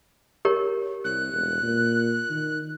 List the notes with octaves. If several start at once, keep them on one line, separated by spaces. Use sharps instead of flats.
G4 A#4 C#5
C2 F#6
E1
A#2
D#3